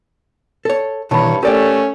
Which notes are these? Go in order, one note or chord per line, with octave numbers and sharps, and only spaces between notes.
A4 C#5
G2 B2 D#3 E3 C#5 A5 B5
A3 C#4 G4 A#4 D5 G5